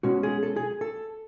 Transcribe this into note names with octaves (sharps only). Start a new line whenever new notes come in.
B2 G#3 C#4 F#4
G#4
A4
G#4
A4